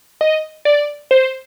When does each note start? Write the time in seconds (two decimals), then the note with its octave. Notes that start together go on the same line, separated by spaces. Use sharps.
0.21 D#5
0.65 D5
1.11 C5